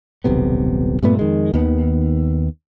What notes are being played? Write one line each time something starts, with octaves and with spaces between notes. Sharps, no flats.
D#1 B1 C3 B3
G2 A#2 A3 B3
F2 D#3 G#3
D#2 D#3 B3